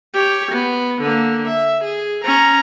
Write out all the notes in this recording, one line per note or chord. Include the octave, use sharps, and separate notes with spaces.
G4 C#5
B3
D3 A#3
E5
G#4
C#4 A#5